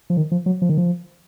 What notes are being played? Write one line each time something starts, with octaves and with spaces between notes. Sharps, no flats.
F3
D#3
F3
F#3
F3
D#3
F3